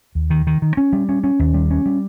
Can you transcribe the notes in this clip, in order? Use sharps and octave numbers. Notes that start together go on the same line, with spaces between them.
D#2
D#3
D#3
D#3
C#4
G3
C#4
C#4
D#2
G3
C#4
G3